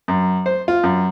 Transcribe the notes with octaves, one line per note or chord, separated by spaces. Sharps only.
F#2
C5
F4
F#2